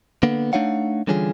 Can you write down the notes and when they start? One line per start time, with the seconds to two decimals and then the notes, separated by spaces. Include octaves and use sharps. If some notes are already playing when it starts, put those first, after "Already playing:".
0.23 D3 A#3 B3
0.53 A3 D4 D#4 C#5 F5 F#5
1.07 D3 E3 G3 C#4 F4 G#4